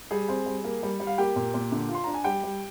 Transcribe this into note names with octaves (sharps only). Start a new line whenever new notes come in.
G3 G#4 G#5
C4
G3
A#3
G3
G3
F5
A#3 G4 G5
A#2
A#2
D3
F4
C6
D4 A#5
G#5
G3 G4 G5
G3